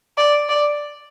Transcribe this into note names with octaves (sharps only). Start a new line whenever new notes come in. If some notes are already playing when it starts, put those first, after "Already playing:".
D5
D5